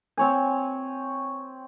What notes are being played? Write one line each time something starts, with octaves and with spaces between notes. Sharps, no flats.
C4 C#5 G#5